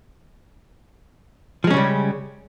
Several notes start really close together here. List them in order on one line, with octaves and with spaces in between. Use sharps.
F3 G#3 C#4 C#3 G3